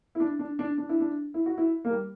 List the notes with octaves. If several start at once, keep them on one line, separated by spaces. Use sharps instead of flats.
E4
D4
D4
D4
D4
E4
D4
E4
F#4
E4
A#3
G3